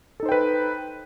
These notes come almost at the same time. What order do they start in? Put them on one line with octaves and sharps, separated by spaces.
A4 D#4 C5 G5 B4